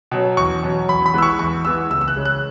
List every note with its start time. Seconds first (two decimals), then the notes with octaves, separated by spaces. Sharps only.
0.11 B2 F#3 C#4
0.37 E2 C#6
0.63 B2 F#3 C#4
0.89 E2 B5
1.06 B5
1.14 E3 G#3 B3 E6
1.22 C#6
1.39 E2 C#6
1.65 E3 G#3 B3 E6
1.90 C#2 E6
2.01 E6
2.08 F#6
2.16 C#3 G#3 C#4
2.25 F#6